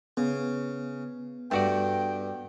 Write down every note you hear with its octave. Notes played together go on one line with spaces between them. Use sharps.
C#3 B3
G2 A3 F#4 D5 G5